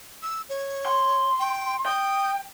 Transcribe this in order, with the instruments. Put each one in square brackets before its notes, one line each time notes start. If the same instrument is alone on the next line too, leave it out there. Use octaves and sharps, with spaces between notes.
[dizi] E6
C#5
[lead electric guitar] C6
[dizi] G5
[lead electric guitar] G5 [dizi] D#6